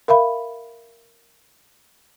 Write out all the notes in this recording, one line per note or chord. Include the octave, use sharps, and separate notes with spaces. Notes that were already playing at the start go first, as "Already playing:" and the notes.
A#4 E5 F5 B5